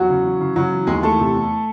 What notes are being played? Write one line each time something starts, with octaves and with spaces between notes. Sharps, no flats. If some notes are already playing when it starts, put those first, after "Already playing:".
Already playing: E2 F#3 F#4
C#3
E3
C#3
C#3 F#3 F#4
E3
D#2 G#3 G#4
E3 A3 A4
C3
E2